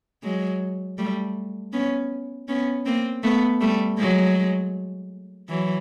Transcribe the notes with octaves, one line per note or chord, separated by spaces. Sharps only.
F#3 G#3
G3 A3
B3 C#4
B3 C#4
A#3 C4
A3 B3
G3 A3
F#3 G#3
E3 F#3